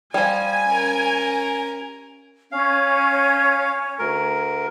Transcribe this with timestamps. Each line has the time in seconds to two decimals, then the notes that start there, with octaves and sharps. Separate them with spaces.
0.14 F3 G3 G#5
0.67 C#4 A#4
2.52 C#4 F5
3.99 D2 A#4